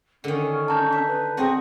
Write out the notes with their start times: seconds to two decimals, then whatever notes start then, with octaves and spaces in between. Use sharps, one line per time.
0.24 D3 D#3 C#4
0.68 A5 A#5 G6
0.92 E5
1.07 B4
1.37 C4 F#4 G#4 D#5